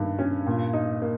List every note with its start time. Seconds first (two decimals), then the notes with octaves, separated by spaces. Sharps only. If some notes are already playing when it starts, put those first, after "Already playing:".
Already playing: G2 D#3
0.19 C#4
0.46 A#2
0.73 D#4
1.02 A#3